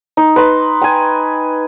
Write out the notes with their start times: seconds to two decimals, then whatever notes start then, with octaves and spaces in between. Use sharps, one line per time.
0.17 D#4
0.36 B4 C6
0.82 G5 G#5